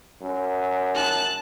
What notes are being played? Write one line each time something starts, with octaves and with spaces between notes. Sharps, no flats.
F#2
A5 F#6